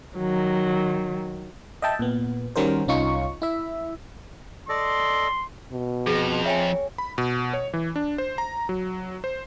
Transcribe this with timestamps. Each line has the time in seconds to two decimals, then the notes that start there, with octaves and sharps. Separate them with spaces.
0.18 D#3 F#3
1.82 D#5 E5 G5 A5
1.99 A#2 B3
2.56 D#3 G3 C#4 F#4 A#4 C5
2.88 C2 C#4 D#4 F4 C#6
3.42 E4 E5
4.69 A4 D5 D#5 C6
5.72 B2
6.06 F2 G#4
6.45 C#5 E5 G5 G#5
6.98 B5
7.18 B2
7.53 C#5
7.74 E3
7.96 D4
8.18 C5
8.38 A#5
8.69 F#3
9.24 C5